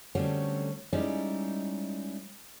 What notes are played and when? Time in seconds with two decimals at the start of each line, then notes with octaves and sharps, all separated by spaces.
0.15 D3 F#3 G3 A3 C4 C#4
0.93 G3 G#3 C#4 D#4 E4 D5